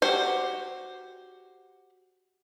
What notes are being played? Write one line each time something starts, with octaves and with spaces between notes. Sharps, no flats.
F#4 G4 C5